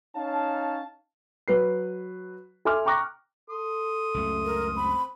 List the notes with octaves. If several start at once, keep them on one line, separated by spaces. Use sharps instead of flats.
C#4 D#4 C#5 F5 A5
F#3 B4 C7
A4 E5 G#5 C6 D6 F6
G5 A#5 C#6 D6 F#6 A#6
A4 C6 D#6
C#2 F#2 A3
A#4
C4 B5